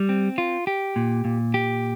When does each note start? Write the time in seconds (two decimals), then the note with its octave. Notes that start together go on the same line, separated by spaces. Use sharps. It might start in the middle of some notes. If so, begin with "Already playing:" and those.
Already playing: G3
0.09 C4
0.38 F4
0.67 G4
0.96 A#2
1.25 A#2
1.54 G4